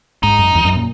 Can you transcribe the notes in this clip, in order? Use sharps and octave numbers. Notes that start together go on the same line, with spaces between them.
G#2 D#4
F#2
E2
F#2
A#2